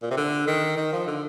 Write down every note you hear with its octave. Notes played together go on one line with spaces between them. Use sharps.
A#2
C3
D3
D#3
D#3
F3
D3